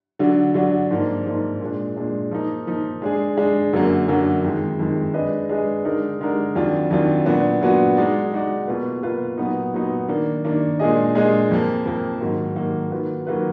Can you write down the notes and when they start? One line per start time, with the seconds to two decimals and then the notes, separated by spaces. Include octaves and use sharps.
0.19 D3 F#3 D4
0.54 D3 F#3 D4
0.91 G#2 F3 A#3 D4
1.26 G#2 F3 A#3 D4
1.61 A#2 G#3 D4
1.96 A#2 G#3 D4
2.31 F3 A#3 D#4
2.67 F3 A#3 D#4
3.02 G#3 D4 G#4
3.37 G#3 D4 G#4
3.73 F#2 D3 F#3 A#3
4.08 F#2 D3 F#3 A#3
4.43 F2 D#3 G#3
4.79 F2 D#3 G#3
5.14 G#3 D4 G#4 B4 D#5
5.49 G#3 D4 G#4 B4 D#5
5.85 D3 G#3 D#4 A#4 D5
6.20 D3 G#3 D#4 A#4 D5
6.55 F2 D#3 F#3 D4 F4
6.91 F2 D#3 F#3 D4 F4
7.26 A#2 F#3 B3 D4 F#4
7.61 A#2 F#3 B3 D4 F#4
7.97 G#3 D#4 F#4 D5
8.32 G#3 D#4 F#4 D5
8.67 B2 A#3 F4 B4
9.03 B2 A#3 F4 B4
9.38 A#2 F#3 B3 D#4
9.74 A#2 F#3 B3 D#4
10.08 D#3 A#3 D4
10.45 D#3 A#3 D4
10.79 A#2 G#3 D4 G#4 D#5
11.15 A#2 G#3 D4 G#4 D#5
11.50 F2 F3 A#3
11.86 F2 F3 A#3
12.21 G#2 D#3 F#3 A#3
12.56 G#2 D#3 F#3 A#3
12.91 D#3 F#3 A#3 F4 B4
13.27 D#3 F#3 A#3 F4 B4